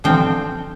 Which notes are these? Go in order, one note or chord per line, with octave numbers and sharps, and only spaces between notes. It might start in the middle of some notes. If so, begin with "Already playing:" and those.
D3 F3 C4 G5